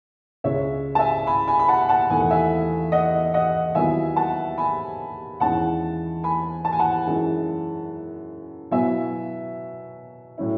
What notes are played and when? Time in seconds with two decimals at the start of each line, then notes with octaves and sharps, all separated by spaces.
0.44 C#2 C#3 G#3 C#4 C#5 E5
0.95 A5
0.99 E5 G#5
1.27 G#5 B5
1.48 G#5 B5
1.59 B5
1.68 F#5 A5
1.89 F#5 A5
2.10 E2 D#3 A3 G#5
2.20 F#5
2.30 E5 G#5
2.92 D#5 F#5
3.34 D#5 F#5
3.75 D#2 D#3 F#3 B3 E4 E5 G#5
4.16 F#5 A5
4.58 G#5 B5
5.40 E2 D#3 G#3 C#4 E4 F#5 A5
6.24 G#5 B5
6.65 A5
6.73 G#5
6.80 F#5 A5
7.06 F#2 E3 G#3 D#4
8.71 B2 F#3 B3 E4 E5 G#5
10.38 A2 F#3 C#4 E4